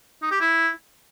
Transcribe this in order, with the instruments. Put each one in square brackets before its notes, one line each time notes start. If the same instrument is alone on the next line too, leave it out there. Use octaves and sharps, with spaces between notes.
[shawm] D#4
G4
E4